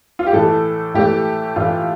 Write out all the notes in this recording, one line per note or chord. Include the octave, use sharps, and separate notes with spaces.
F4
G4
A2 E3 A3 A4
A2 E3 A3 G4
A2 E3 A3 F4